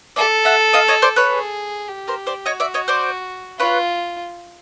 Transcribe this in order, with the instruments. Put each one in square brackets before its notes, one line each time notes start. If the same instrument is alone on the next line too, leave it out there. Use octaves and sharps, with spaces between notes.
[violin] A4 [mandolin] D5 E5
[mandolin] E5 F#5
D#5 F5
C#5 D#5
C5 D5
B4 C#5
[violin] G#4
G4
[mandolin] A#4 C5
C5 D5
[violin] F#4 [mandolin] C#5 D#5
[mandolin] D5 E5
C#5 D#5
C5 D5
[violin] F4 [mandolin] B4 C#5